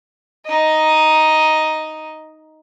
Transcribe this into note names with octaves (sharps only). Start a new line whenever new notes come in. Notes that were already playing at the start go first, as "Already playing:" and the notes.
D#4 D#5